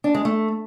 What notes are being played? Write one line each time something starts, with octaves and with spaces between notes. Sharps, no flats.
D4
G#3
A3